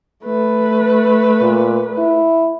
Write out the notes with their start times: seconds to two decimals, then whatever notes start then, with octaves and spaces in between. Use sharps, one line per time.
0.24 A3 B4
1.41 A#2
1.98 E4